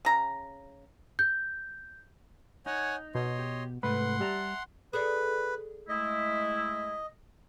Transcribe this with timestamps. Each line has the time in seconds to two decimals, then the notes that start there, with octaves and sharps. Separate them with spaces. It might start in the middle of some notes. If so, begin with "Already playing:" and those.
0.05 C#3 A#5
1.19 G6
2.66 D#4 C#5 F#5 G#5
3.15 B2 C#5 D#5 C6
3.39 G4
3.83 G#2 C3 A3 B4 F#5 C6
4.20 G3 E5 A5 A#5
4.93 G#4 A4 B4 D5
5.89 G#3 A3 E4 D#5